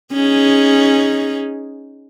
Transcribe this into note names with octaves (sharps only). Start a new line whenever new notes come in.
C#4 D#4 G#4